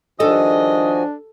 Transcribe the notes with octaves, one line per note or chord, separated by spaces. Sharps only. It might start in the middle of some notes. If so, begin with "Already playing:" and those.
G2 D#3 F3 D4 F#4 A4 D#5 G#5